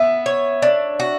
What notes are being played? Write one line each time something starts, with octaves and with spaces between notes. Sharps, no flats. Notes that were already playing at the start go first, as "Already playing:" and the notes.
Already playing: B3 E5
C#5
D4
F#4